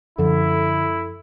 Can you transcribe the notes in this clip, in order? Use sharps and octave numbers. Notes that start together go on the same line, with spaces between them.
F#2 D3 F3 E4 A4